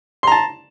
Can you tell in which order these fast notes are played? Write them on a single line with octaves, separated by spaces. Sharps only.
C6 A#5 A5